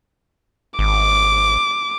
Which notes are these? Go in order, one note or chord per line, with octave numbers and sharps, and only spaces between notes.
G#1 D6